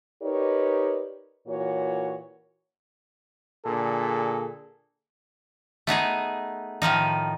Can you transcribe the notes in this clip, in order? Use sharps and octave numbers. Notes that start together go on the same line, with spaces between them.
D#4 G4 A#4 B4 C#5 D5
A#2 E3 F#4 C#5
A#2 D3 G#4 A4
A3 B3 D#4 G#4
A2 D#3 F3 D#4